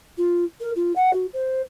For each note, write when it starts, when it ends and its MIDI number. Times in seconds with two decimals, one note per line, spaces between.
0.18 0.44 65
0.60 0.71 70
0.76 0.92 65
0.96 1.13 78
1.13 1.26 66
1.33 1.61 72